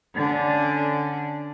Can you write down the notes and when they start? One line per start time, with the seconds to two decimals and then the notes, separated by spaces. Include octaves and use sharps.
0.14 D3 C#4 D4